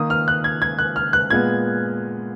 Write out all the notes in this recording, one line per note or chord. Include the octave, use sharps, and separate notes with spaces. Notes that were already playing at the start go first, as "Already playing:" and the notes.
Already playing: D#3 A#3 D#6
F6
F#6
G#6
G#6
F#6
F6
F#6
A#2 G#3 B3 G#6